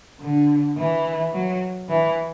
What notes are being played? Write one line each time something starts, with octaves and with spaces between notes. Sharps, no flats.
D3
E3
F#3
E3